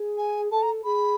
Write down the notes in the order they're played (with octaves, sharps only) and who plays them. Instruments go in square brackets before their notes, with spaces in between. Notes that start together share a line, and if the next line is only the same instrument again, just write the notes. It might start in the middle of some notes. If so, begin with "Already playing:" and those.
Already playing: [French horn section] G#4
[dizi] G#5
[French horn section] A4 [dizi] A5
[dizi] A#5
[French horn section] G#4 [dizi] B5